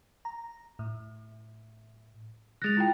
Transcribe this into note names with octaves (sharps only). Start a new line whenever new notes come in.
A#5
A2
G#3 F#6 A6 A#6 F7
E4 F4 G5